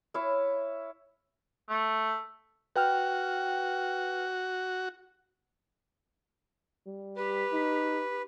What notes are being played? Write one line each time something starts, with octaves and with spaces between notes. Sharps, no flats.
E4 C#5 E5 F5
A3
F#4 B4 G5 F6
G3
G4 B4
D#4